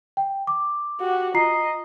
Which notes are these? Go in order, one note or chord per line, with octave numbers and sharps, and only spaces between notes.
G5
D6
F#4 G4
F4 D#5 A#5 C7